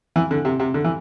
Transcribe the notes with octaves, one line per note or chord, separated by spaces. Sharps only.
E3
D3
C3
C3
D3
E3